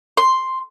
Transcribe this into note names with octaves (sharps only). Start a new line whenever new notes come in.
C6